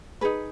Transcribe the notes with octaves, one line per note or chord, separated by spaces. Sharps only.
D#4 G#4 B4